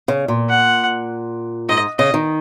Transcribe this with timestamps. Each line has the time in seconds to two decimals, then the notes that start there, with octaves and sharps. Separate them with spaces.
0.08 C#3
0.28 A#2
0.49 F#5
1.69 G#2 D#5
1.99 C#3 D#5
2.14 D#3